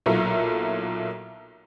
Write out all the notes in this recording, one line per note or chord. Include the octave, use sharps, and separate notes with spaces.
B1 A#2 A#3 E4 A4 A#5